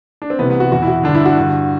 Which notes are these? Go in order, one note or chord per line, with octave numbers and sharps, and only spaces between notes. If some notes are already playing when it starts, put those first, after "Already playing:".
D4
C4
C2 C3 E3 B3
B3
F#4
E2 B2 F#4
E4
F#4
G2 D3 D4
E4
F#4
G2 D3